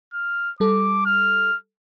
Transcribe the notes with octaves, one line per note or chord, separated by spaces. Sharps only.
F6
G3 A4 D6
F6